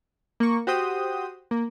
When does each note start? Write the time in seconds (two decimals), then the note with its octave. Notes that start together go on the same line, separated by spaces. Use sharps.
0.40 A#3 C#6
0.67 F#4 G4 C5 G5 D#6
1.51 A#3